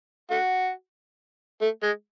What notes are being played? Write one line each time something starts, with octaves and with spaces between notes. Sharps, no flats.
A3 F#4
A3
G#3